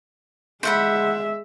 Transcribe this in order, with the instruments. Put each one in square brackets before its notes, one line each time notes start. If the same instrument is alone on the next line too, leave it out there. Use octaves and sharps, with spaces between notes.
[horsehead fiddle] G#3 E5 [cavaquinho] C5 F#5 B5